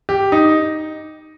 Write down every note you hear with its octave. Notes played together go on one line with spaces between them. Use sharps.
G4
D#4